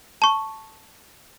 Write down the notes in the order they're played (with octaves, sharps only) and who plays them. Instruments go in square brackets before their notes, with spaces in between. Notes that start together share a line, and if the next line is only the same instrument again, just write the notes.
[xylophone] A5 C#6